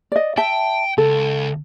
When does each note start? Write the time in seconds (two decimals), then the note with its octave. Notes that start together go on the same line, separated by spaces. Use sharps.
0.12 D5 D#5
0.38 E5 G5 A5
0.98 C#2 A4